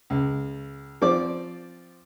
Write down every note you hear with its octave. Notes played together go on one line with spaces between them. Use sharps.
C#2
F3 C4 D5 D6